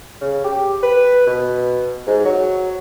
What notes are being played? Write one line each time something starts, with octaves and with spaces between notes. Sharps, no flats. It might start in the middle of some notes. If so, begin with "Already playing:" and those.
C#3
G4
B4
B2
G#2
F#3